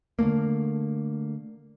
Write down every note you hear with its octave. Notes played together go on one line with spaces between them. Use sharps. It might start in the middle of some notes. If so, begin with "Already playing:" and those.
D3 E3 A3 A#3